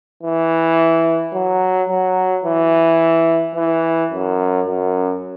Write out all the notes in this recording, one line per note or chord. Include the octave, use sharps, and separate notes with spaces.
E3
F#3
F#3
E3
E3
F#2
F#2